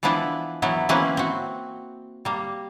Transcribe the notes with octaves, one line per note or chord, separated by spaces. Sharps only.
E3 F3 B3 D4 E4 B4
E3 F#3 B3 E4
E3 A#3 C4 C#4 E4 B4
C4 F#4
G3 A#3